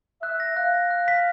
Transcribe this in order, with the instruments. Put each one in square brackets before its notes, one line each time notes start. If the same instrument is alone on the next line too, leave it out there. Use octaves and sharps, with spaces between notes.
[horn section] E5 [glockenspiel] F#6
[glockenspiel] A#6
[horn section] F5 [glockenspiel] F#6
[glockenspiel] A#6
F#6
B6